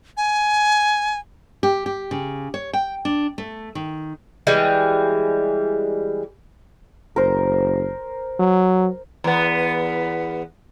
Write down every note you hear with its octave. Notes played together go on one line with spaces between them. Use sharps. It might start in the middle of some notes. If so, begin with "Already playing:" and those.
G#5
G4
G4
C#3
C#5
G5
D4
A3
D#3
E3 G3 G#3
F#1 A#4 C5
F#3
E2 B3